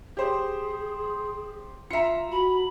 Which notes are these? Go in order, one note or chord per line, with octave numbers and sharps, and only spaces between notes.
G4 G#4 C5
F4 E5 A#5 C#7
F#4 B5